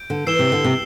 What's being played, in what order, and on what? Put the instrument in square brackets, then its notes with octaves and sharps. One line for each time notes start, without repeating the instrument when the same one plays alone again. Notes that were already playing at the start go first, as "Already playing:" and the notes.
Already playing: [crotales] G6 D7
[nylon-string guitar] D3
[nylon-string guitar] E3 [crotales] E6 C7 E7 G7
[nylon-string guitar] C3
D3
C3